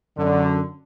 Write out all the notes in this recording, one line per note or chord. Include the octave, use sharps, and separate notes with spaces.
F#2 D3